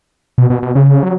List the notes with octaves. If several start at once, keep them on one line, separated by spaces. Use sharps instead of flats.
B2
B2
B2
C#3
F#3